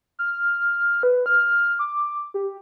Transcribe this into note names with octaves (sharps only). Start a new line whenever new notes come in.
F6
B4
F6
D6
G4